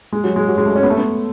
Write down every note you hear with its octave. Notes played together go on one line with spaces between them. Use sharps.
G#3
F#3
G#3
F#3
G#3
A3
C#4
B3
A3
B3